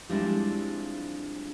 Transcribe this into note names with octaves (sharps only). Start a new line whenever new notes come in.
F3 G3 G#3 C4 D4 E4